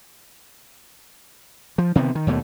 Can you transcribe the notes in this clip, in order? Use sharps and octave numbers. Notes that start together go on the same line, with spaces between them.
F3
C3 D#3 G3 B3
D#3
D#2 B2 A3